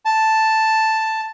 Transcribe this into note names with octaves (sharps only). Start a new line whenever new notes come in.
A5